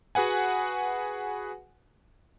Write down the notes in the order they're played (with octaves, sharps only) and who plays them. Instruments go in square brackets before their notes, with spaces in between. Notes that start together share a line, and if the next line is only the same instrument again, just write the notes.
[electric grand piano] F#4 G#4 B4 F#5 G#5